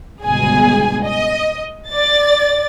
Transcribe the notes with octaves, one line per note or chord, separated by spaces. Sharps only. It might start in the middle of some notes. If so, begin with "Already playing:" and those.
G1 C#2 B2 G#4 G#5
D#5
D5 A6